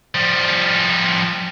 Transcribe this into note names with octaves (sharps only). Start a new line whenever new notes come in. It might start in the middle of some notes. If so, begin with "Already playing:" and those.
F3 G3